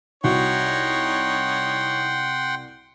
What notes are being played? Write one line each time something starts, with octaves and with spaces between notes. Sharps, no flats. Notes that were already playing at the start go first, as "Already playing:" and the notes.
C2 D#4 F#4 C#5 F#5 G5 C6